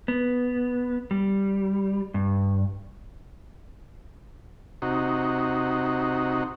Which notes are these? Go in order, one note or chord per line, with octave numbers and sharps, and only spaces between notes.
B3
G3
G2
C3 D#4 F#4